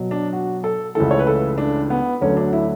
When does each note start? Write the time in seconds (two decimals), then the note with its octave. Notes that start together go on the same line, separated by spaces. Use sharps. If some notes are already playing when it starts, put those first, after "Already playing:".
Already playing: B2 F#3
0.11 D4
0.33 F#4
0.64 A4
0.95 C#2 C#3 E3 A3 A4
1.11 C#5
1.19 B4
1.27 A4
1.58 D4
1.90 B3
2.21 D2 D3 F#3 A3 C#4
2.37 D4
2.53 E4